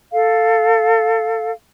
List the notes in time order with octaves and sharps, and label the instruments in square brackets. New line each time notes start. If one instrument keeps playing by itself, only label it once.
[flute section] A4 F5